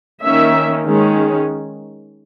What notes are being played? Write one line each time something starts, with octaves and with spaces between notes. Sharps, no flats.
D#3 A#3 C#4 E5
D#3 G#3 C#4